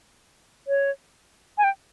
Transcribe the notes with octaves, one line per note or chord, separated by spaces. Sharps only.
C#5
G#5
G5